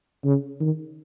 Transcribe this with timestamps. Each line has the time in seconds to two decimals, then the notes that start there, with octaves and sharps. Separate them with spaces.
0.25 C#3
0.60 D#3